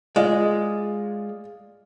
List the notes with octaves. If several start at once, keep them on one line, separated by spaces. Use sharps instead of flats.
G#3 F4 D5 F5